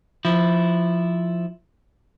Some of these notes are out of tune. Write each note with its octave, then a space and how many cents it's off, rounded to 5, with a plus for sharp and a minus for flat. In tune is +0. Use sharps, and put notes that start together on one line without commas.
F3 +0 E4 +0